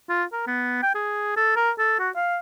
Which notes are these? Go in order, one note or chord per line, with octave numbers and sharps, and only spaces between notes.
F4
A#4
B3
G5
G#4
A4
A#4
A4
F#4
F5